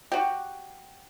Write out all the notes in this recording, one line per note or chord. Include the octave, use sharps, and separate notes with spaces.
F#4 G4